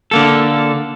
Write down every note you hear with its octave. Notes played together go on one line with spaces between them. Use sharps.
D3 A#3 A4